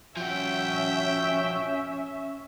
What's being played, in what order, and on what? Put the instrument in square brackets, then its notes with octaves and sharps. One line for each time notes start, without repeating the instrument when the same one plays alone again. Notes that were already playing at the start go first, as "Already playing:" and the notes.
[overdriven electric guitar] F3 F#4 [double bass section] C#4 [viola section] E5 [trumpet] G5